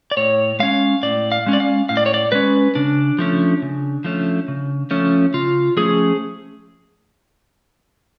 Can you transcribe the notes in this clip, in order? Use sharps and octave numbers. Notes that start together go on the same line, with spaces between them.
D5
A2 C#5
G#3 C#4 F5
A2 D5
F5
G#3 C#4
D5
F5
A2 F5
D5
C#5
D5
G#3 C#4 B4
C#3 D4
F3 A3 C#4
C#3
F3 A3 C#4
C#3
F3 A3 C#4
C#3 F4
F3 A3 C#4 G#4